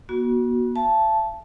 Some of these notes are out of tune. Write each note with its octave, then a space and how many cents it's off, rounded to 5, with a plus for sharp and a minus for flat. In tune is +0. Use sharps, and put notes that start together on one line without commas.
B3 -45 F#4 +0
E5 +45 A5 -10